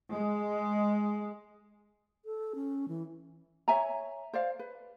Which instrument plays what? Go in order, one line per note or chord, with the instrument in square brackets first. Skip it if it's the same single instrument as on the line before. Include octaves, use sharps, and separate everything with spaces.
[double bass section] G#3
[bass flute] A4
C#4
E3
[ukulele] C#5 E5 G#5 A#5
C5 D5 F5
B4